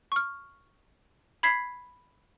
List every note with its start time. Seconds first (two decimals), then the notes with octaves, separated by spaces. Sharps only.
0.12 C#6 F6
1.43 B5 G#6 B6 C7